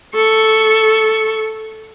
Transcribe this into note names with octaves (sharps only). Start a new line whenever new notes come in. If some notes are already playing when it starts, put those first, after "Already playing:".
A4 C#6